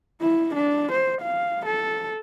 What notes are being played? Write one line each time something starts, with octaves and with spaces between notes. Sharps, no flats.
E4
D4
C5
F5
A4